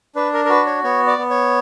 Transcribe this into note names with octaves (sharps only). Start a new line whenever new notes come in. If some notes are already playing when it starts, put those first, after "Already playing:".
D4 B4
A#4
A#4
F#4 B4
C#5
B3 C#5
D5
B3
C#5